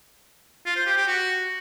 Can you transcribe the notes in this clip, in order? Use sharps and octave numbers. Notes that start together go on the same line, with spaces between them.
F4
C5
G4
G4
F#4